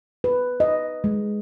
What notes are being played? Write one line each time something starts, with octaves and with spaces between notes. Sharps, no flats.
B4
D#5
G#3